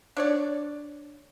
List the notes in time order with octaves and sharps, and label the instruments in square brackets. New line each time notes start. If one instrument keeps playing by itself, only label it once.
[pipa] D4 C#5 D5